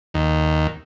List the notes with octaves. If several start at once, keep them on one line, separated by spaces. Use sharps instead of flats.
D#2